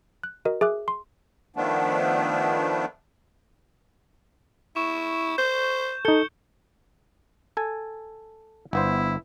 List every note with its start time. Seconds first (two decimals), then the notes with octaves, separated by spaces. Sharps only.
0.23 F#6
0.45 F#4 A#4 D#5
0.61 G#4 E5 D6 F#6
0.88 C6
1.56 D#3 F3 A3 B3 D4
4.76 E4 C#6 E7
5.38 C5 G6
6.05 D#4 A4 G6 C#7 G7
7.57 A4 G#5
8.73 G1 B3 E4 C5